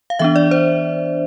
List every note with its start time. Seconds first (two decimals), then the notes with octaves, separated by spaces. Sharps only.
0.10 F5
0.19 E3 B3 D4 E5
0.36 D5
0.51 C5